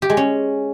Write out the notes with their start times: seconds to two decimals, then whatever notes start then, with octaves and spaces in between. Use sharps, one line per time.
0.02 G4
0.10 G#3
0.17 C#4